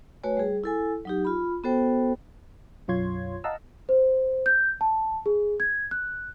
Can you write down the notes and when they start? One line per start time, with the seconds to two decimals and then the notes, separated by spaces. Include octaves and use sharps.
0.23 A3 F#4 B4 C#5 G#5
0.37 G3 G#4
0.64 E4 A4 G#5
1.05 F#3 D#4 G4
1.25 F4 B5
1.64 B3 F#4 A4 C5 G5
2.88 B1 F#2 F4 C#5 C6 G#6
3.44 D#5 F5 F#5 A5 A#5 E6
3.89 C5
4.46 G6
4.81 A5
5.26 G#4
5.60 G#6
5.91 F#6